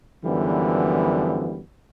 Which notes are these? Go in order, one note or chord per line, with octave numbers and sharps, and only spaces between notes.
F#2 D3 E3 F3 G3 B3